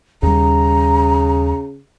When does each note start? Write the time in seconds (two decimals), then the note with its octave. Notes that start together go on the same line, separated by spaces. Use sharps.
0.23 D#2 C#3 G3 A#5